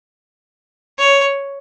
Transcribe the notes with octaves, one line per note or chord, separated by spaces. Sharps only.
C#5